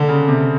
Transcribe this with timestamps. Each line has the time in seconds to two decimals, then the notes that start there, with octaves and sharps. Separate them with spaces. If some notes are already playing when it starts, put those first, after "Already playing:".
Already playing: D3
0.08 C#3
0.28 C3